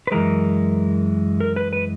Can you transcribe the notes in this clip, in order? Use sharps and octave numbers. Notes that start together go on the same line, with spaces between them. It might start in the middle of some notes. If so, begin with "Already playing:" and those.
B4
F#2 E3 G#3 A#4
A#4
B4
B4